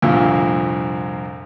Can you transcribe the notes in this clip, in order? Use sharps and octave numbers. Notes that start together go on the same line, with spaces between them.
C2 F2 A#2 D3 F4 E6